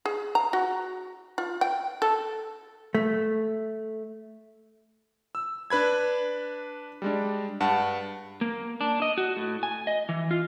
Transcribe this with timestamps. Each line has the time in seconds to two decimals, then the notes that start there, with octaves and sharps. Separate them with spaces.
0.05 G#4
0.35 A#5
0.53 F#4
1.38 F4
1.61 G5
2.02 A4
2.95 A3
5.35 E6
5.70 D4 B4 B5 G#6
7.02 G3 G#3 D4
7.60 G2 F#5 A5
8.41 A#3
8.81 D4
9.02 D#5
9.18 F#4
9.37 A2
9.63 G#5
9.87 D#5
10.09 E3
10.31 F4